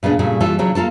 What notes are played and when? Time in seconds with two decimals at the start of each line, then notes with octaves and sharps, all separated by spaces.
0.03 A#2 C#3 B3 D4
0.19 A#2 C#3 G3 A3
0.40 E3 G3 F4 A4
0.59 C#3 F#3 D4
0.75 A#3 F4 A4 A5